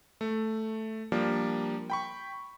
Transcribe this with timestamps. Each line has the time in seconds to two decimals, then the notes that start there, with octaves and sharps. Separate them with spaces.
0.21 A3
1.12 F3 G3 A#3 D4
1.90 G5 B5 C#6